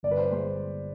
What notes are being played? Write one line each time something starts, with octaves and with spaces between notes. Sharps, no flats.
G1 D5
B4
C5
G#3 C5